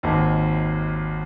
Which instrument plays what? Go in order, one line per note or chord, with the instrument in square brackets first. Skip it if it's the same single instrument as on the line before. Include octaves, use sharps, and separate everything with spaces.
[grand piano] G#1 D#2